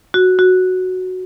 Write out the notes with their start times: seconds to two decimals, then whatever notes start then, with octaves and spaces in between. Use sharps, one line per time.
0.14 F#4
0.39 F#4